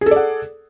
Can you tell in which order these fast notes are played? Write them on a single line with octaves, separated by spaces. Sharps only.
G#4 A4 D5 F#5